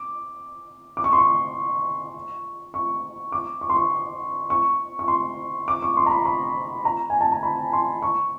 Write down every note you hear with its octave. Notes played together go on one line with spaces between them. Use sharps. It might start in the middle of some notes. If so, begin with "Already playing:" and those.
Already playing: D6
D6
C#6
C6
C#6
C#6
D6
C#6
C6
C#6
C#6
C#6
C6
D6
C#6
C6
A#5
B5
B5
A#5
G#5
A5
A#5
B5
C6
C#6